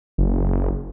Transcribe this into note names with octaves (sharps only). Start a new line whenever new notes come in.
F#1